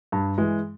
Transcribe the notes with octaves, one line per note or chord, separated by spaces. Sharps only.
G2
E3 G#3